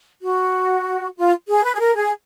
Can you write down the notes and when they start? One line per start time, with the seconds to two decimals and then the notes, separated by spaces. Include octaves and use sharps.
0.22 F#4
1.17 F4
1.48 G#4
1.64 B4
1.74 G#4
1.80 A#4
1.95 G#4